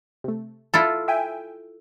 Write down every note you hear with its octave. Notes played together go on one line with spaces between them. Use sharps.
C3 A3
E4 F4 A4
E5 G5 G#5